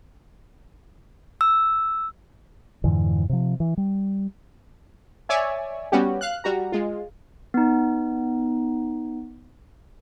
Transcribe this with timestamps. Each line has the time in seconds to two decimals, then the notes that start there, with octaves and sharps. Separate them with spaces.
1.41 E6
2.84 F2 G#2 D3 E3
3.29 C3 F3
3.60 E3
3.78 G3
5.29 C#5 D5 E5 G#5
5.92 G3 B3 C#4 F#4 G4
6.21 F5 F#6
6.44 G3 F#4 A#5
6.72 G#3 F4
7.54 B3 D#4